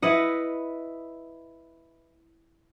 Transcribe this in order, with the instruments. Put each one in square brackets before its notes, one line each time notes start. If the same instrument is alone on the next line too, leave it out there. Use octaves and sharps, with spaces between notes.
[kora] E4 B4 D#5 F#5